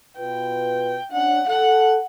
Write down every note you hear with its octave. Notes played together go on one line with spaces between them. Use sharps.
B2 F4 B4 G5
C#4 D4 F#5
A4 F#5